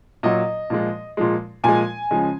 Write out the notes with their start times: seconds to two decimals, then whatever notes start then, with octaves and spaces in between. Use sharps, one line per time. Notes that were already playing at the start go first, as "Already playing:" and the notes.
0.23 A#2 F#3 D#5
0.70 A#2 F3 G#3
1.17 A#2 F3 G#3
1.64 A#2 F3 G#3 G#5
2.11 C#3 F3 G#3